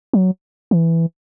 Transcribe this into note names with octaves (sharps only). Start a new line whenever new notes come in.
F#3
E3